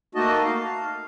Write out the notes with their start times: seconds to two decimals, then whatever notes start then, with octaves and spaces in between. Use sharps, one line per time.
0.15 A3 A#3 D#4 F#4 D#5 A5
0.44 F5